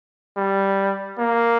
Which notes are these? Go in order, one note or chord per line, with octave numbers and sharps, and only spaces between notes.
G3
A#3